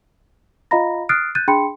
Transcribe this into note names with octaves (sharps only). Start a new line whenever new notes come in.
F4 D#5 F5 A#5 B5 A#6
D#6 F6 F#6 A6 C7 D7
F#6 G6 A6 D#7
D4 G#4 G5 B5 C6 C#7